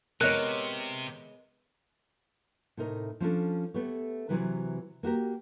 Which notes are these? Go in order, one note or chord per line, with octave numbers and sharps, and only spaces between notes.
C3 G#3 B3 A#4 C#5 D#5 F#6
A2 C3 D#4 A#4 C#5
F3 C#4 D4 A4
A3 B3 G4 C#5
C3 D#3 E3 F#3 G4 B4
A#3 F#4 G4 A#4